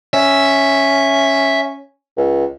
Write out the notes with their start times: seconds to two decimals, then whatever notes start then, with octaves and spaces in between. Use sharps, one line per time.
0.13 C#4 E5
2.17 C#2